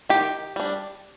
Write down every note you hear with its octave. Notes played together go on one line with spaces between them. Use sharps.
D#3 G4
G3 D4